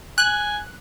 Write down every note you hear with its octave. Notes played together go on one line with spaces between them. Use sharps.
G#5 F#6